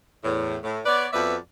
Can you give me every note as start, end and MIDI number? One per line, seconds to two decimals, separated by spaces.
0.24 0.57 40
0.24 0.57 45
0.64 0.81 45
0.86 1.07 59
0.86 1.07 71
0.86 1.07 73
0.86 1.07 74
1.13 1.36 41
1.13 1.36 59
1.13 1.36 66
1.13 1.36 71
1.13 1.36 74
1.13 1.36 76